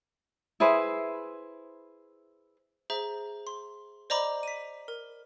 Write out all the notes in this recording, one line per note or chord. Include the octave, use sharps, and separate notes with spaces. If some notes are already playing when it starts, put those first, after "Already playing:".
E4 G#4 B4 C5
G#4 C5 E5 A#5
C6
C5 D5 D#5 A#5 B5 D6
B6 D#7
A#4